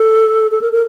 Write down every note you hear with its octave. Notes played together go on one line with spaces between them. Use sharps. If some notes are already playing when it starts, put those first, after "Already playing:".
Already playing: A4
A4
A#4
A#4